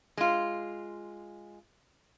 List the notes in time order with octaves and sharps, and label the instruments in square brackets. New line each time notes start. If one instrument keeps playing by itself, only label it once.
[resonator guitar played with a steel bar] G#3 F4